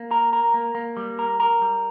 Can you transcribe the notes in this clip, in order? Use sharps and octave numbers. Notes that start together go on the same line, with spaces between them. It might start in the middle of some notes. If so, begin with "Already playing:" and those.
Already playing: A#3
A#4
A#4
A#3
A#3
G3
A#4
A#4
G3